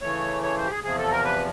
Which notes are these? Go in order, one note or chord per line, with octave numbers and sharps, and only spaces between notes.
C#3 E3 A3 C#5
C#5
C5
G4
G#4
E2 C3 F3 G#4
A4
A#4
B4